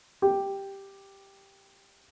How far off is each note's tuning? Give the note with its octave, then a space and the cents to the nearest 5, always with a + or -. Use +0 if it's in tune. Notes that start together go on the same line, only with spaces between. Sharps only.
G4 +0